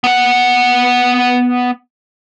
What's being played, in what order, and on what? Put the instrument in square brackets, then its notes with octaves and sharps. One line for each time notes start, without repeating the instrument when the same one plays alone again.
[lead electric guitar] B3 F#5